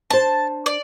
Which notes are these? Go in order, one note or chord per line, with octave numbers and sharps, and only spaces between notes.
D4 C5 A5
D5